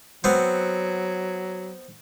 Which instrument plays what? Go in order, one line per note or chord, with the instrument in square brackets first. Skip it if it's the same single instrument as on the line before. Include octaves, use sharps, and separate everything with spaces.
[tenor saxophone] F#3 [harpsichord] B3 C4